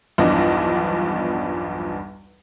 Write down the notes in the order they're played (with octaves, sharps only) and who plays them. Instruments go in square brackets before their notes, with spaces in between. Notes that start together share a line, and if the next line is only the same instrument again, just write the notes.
[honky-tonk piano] B1 E2 G2 F3 D4 D#5